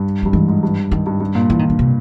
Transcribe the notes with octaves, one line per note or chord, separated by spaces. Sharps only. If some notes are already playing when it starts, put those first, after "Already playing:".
Already playing: G2
G2 F3
G#2 E3
G#2
G2
G2 D#3
G2
G2
A#2
E3
D#3
D3
C3